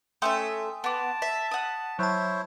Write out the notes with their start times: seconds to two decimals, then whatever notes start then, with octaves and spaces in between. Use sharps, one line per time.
0.22 A3 C#4 E5 G5 C6 D#6
0.84 B3 A5 D6
1.22 E5 B6
1.51 F#5 D#6
1.99 F#3 E4 C5 C#5 A5